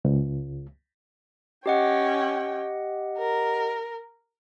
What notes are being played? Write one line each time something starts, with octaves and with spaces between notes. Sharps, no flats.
C#2
C#4 G4 D#5 F#5 G5
A#4